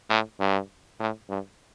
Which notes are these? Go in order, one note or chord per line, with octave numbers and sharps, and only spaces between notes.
A2
G2
A2
G2